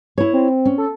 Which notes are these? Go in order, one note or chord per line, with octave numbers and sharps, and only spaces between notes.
E4 C#5
C4
C#4
A4